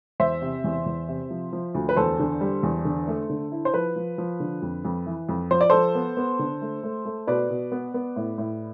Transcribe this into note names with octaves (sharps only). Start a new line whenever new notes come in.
E2 C5 E5
C3
E2
E2
C3
F3
F3
D2
B4
E2 A4 C5
D3
G3
E2
D3
A3
D3
E4
C5
F3 B4
F3
F3
D3
F2
F2
E3
F2
F3 C5
D5
F3 A4 C5
B3
B3
D3
A3
A3
A3
B2 B4 D5
B2
B3
B3
A2
A2